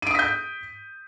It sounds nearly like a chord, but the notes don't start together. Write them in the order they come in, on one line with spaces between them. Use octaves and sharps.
D#7 D7 D#6 B6 G6